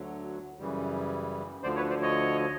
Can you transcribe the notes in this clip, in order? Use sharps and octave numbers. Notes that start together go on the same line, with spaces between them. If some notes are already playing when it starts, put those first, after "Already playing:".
Already playing: D2 D3 F#3
F#2 C#3 E3 G3
D2 D3 F3 C5 D5
B4 C#5
C5 D5
C#5 D#5